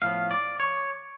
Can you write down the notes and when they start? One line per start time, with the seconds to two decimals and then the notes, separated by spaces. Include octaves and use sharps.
0.02 A2 F3 B3 F5
0.31 D5
0.60 C#5